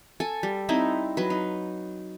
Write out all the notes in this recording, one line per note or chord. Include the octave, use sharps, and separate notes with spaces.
A4 G#5
G3
C4 D#4 E4 D#5
F#3 B4
D#4